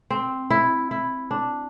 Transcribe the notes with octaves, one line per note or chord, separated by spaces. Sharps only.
C4
E4
E4
D4